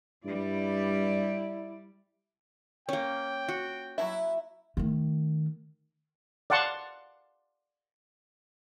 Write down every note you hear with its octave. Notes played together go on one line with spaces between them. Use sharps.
G2 G3 E4 D5
A#3 C#4 C#5 G5
F#4
F#3 D#4 E4 E5
D#3 A3
D5 F5 F#5 A5 C6 C#6